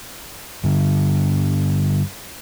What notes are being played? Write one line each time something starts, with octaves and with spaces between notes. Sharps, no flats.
G2 D3